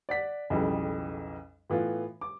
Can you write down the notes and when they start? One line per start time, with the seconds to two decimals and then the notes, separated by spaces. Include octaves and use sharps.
0.09 D5 F#5 B6
0.50 B1 F2 C#3 E3 G3
1.70 A2 E3 B3 F4
2.21 D6